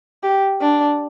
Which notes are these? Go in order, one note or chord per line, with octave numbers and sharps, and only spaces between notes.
G4
D4